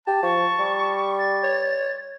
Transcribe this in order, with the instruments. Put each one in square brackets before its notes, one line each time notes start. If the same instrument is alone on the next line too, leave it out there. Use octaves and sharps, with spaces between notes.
[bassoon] G4 [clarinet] A5
[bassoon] F3 [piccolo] C#6
[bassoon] G3
[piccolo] A6
[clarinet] C#5